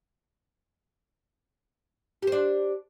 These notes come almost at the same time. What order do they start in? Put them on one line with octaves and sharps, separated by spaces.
G4 C5 D4